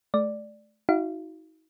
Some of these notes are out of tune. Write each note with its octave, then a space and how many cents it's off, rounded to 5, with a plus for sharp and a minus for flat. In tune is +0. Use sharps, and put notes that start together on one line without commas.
A3 -30 D5 +5
D#4 +45 F#4 +0 F5 -25